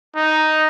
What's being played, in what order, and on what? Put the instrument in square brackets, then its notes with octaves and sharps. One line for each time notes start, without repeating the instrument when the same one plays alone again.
[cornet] D#4